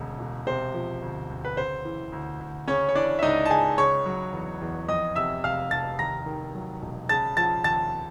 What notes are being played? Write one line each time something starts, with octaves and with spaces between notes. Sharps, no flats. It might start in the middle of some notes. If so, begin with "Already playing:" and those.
Already playing: E1 D2 C#3
E1
C3 C5
F3
D2
D2
B4
C#3 C5
E3
D2
D2
C#3 C#4 C#5
C#5
E3 D4 D5
E5
C#2 D#4 D#5
A5
C#2 G#4 G#5
C#3 C#5 C#6
F#3
E2
E2
F2 D#5 D#6
C3 E5 E6
F1 F5 F6
F1 A5 A6
D#2 A#5 A#6
D#3
F#3
E1
C#3 A5 A6
F3 A5 A6
D#2 A5 A6